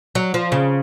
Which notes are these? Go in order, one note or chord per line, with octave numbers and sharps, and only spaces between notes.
F#3
F3
C#3